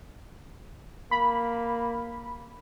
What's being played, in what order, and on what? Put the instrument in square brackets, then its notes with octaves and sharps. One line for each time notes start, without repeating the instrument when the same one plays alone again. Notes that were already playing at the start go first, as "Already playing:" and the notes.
[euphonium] A#3 [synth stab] B5